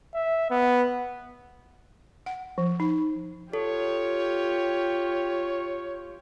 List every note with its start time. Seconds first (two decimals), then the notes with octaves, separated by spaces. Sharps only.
0.14 E5
0.50 B3
2.26 F#5
2.58 F3
2.80 D#4
3.53 F4 G4 A4 C#5